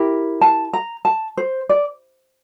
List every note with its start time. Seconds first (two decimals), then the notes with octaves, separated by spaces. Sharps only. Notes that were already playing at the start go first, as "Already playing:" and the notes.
Already playing: E4 G4 A#4
0.41 A5
0.73 A#5
1.05 A5
1.37 C5
1.69 D5